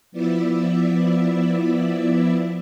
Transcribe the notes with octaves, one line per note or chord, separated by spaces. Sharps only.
F3 B3 E4 D5 E5